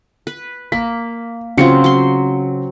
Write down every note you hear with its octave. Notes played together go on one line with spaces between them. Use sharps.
B4
A#3 B6
C#3 F#3 C4 F4 C#7
F#3 C6